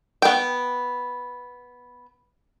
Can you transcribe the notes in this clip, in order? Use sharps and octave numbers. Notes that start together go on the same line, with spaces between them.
B3 G5